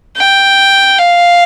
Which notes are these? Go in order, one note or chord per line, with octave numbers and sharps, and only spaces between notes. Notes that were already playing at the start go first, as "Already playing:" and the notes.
G5
F5